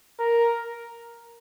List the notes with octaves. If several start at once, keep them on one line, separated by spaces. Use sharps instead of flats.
A#4